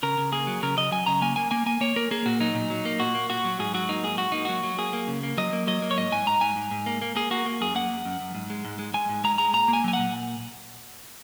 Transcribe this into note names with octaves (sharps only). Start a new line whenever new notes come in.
C#3 A#4
C#3
A#3 G#4
F#3
C#3 A#4
C#3 D#5
F#3 G#5
C#3 A#5
A#3 G#5
A#3 G#5
A#3 G#5
A#3 G#5
A#3 C#5
A#3 A#4
A#3 G#4
A#2 F#4
F#3 D#4
A#2
F#3
A#3
A#2 F#4
A#3
A#2 F#4
F#3
G#2 G#4
F#3 F#4
A#3 D#4
G#2 G#4
G#2 F#4
A#3 D#4
F#3 F#4
F#3
A#3 G#4
A#3
C#3
A#3
F#3 D#5
A#3
F#3 D#5
A#3
C#5
G#2 D#5
G#2 G#5
G#2 A#5
G#2 G#5
G#2
G#2
A#3
A#3
A#3 G#4
A#3 F#4
A#3
F#2 G#4
A#3 F#5
F#2
F#2
F#2
G#2
G#3
G#2
G#3
G#3 G#5
G#2
G#3 A#5
G#3 A#5
A#2 A#5
A#3
G#5
F#3 G#5
F#5
A#2